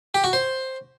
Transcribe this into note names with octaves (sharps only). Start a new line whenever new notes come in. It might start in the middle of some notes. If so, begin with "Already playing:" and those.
G4
F#4
C5